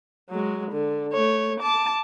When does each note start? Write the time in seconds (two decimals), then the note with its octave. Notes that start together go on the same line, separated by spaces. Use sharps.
0.30 F#3 G#3
0.72 D3
1.13 A3 C#5
1.60 A5 D6